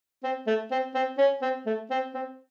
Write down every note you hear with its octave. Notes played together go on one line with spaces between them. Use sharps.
C4
A3
C4
C4
C#4
C4
A3
C4
C4